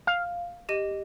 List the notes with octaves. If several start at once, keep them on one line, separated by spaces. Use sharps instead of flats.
F5
G4 D#5 D#7